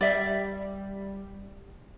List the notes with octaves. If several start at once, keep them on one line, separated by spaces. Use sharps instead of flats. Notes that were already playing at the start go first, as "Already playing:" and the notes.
G3 D5 E5